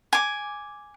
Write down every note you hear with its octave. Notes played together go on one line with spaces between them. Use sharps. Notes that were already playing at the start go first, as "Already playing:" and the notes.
G#5 D6